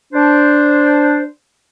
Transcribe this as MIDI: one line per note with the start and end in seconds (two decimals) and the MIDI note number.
0.13 1.24 62
0.13 1.24 72